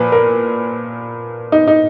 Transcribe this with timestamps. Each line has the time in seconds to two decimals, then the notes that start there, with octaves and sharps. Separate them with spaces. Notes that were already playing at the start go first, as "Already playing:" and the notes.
Already playing: A#2 F3 B4
0.12 A#4
1.52 D#4
1.68 D#4